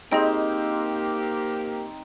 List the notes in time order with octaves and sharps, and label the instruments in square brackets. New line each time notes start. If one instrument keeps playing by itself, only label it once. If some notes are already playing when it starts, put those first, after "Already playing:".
[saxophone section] A#3 G4 [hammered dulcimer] C4 D#4 C5 [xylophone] G#4 D#5 G5